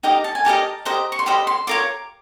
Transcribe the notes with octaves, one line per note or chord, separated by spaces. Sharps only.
D#4 G4 A#4 D#5 G5
A5
G#5
D#4 G4 A#4 D#5 A5
G4 C5 D#5 A#5
C#6
C6
G4 C5 D#5 B5
C6
F4 A#4 C#5 D6